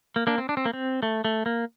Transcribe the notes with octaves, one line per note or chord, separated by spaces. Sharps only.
A#3
A#3 D4
C4
D4
C4
A#3
C4
A3
A3
A#3